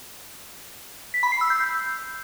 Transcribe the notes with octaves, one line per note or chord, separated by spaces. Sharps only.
B6
B5
C7
E6
G6